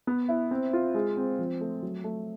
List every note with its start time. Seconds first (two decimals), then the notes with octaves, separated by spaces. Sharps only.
0.07 B3
0.29 E4
0.51 C4
0.73 F4
0.94 G#3
1.17 C4
1.39 F3
1.61 A3
1.83 F#3
2.04 A3